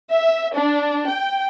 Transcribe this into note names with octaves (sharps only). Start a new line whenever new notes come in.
E5
D4
G5